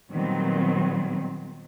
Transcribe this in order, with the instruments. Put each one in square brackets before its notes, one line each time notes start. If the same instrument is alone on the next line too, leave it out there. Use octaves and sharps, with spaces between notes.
[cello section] A#2 D#3 F#3 G3 B3 C4